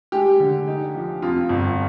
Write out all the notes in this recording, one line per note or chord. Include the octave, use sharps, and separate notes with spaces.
G#3 G4
D3
D#4
F3
F2 F4
G1